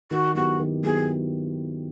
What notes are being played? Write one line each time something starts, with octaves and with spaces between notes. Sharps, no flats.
D#3 F#4
F#3 B3 E4 F#4 G4
D#3
F#3 B3 E4 G4 G#4